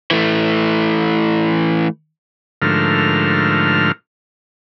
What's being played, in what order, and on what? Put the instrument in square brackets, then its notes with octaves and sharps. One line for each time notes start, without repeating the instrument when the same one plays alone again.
[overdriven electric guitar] E3 A3
[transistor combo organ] G#2 D3 F3 A3 A#4 F6